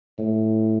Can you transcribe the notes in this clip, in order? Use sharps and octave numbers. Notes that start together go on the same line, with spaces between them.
A2